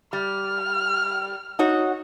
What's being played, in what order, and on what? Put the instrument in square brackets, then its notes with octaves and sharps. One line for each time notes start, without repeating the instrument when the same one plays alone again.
[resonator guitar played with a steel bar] G3 [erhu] F6
[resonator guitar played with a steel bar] D#4 F#4 C#5